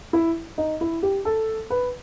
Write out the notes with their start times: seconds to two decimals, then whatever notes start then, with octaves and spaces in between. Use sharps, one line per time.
0.13 E4
0.58 D#4
0.81 E4
1.03 G4
1.25 A4
1.70 B4